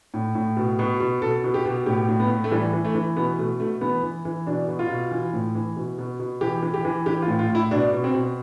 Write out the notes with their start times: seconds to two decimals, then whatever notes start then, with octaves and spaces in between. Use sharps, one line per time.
0.14 A2
0.35 A2
0.57 B2
0.79 B2
1.00 B2
1.22 B2 A4
1.44 B2
1.54 G4
1.65 B2
1.86 A2 G4
2.08 A2
2.20 B3
2.30 A2
2.44 A3
2.51 E3 G3
2.73 E3
2.85 A3
2.95 E3
3.17 B2 B3
3.38 B2 A3
3.60 B2 A3
3.81 E3 B3
4.03 E3
4.25 E3
4.46 B2 D4
4.68 B2
4.79 F4
4.90 B2
5.11 E3
5.33 A2
5.55 E3
5.76 B2
5.98 B2
6.19 B2
6.41 E3 G4
6.63 E3
6.74 G4
6.85 E3
7.06 E3 G4
7.22 F4
7.28 A2
7.39 F4
7.50 A2
7.55 E4
7.71 B2 D4
7.93 B2
8.04 C4
8.14 B2